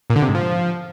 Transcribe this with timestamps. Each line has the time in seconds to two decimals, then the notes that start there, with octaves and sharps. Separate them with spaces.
0.10 A#2
0.16 D3
0.22 C3
0.28 G#2
0.35 F3